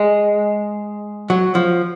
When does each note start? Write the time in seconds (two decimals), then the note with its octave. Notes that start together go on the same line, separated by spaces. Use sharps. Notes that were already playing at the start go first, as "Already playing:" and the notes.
Already playing: G#3
1.30 F#3
1.55 F3